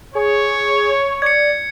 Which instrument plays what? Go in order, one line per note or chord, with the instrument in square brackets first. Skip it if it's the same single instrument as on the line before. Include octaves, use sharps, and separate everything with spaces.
[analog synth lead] G#4 [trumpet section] C#5
[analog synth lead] D5 [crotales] G#6 C#7